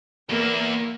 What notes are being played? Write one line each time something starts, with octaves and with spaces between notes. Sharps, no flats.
E2 A#3 E4